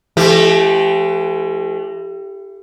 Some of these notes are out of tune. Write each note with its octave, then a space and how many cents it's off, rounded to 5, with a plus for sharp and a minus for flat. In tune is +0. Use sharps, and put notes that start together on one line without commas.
E3 +45 A3 -30 G4 +0